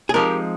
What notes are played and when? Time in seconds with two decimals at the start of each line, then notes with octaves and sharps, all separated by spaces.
0.09 G#4
0.14 F3 G#3 C4 D#4 G4 A#4